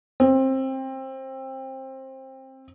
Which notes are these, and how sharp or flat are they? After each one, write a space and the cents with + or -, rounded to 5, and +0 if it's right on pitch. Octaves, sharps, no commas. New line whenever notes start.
C4 +20